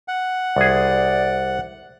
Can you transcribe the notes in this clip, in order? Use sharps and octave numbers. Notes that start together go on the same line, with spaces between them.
F#5
C2 G#4 D5